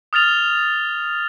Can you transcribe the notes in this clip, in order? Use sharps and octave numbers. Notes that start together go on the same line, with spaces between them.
D#6 F6 A6 F7